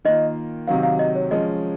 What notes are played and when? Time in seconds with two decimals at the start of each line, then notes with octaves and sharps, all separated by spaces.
0.05 D#3 A#3 F4 D#5
0.68 C3 D#3 F#3 C4 F5
0.83 F5
0.99 D#5
1.15 C#5
1.31 F3 G#3 C#4 D#5